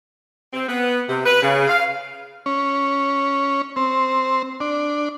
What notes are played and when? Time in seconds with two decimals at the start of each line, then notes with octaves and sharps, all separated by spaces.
0.52 C4
0.67 B3
1.07 C3
1.25 B4
1.41 C#3
1.67 F5
2.46 C#4
3.76 C4
4.60 D4